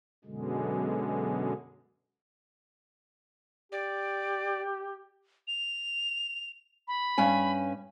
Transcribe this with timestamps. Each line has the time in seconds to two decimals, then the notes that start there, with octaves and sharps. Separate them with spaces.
0.25 F#2 B2 D3 G#3
3.72 G4 D5
5.48 F7
6.88 B5
7.18 G2 C#4 G#5